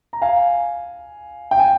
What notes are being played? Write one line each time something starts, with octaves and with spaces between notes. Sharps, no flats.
A#5
F5 G#5
G5
G#5